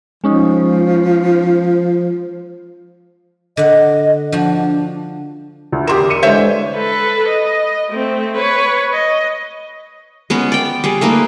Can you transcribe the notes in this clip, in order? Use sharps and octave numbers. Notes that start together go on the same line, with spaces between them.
F3 G#3 C#4 D#4
D3 D#5 F#5
F3 D4 F#4
D2
E2 G4 A#4 C6 E7
C#7 D#7 E7
D3 E3 G#3 C5 C#5 E5
A4 B4
D#5
A3 C4
B4 C#5
D#5
G#3 B3 C#4
D5 G5
G3 G#4
A3 A#3 D#4 B4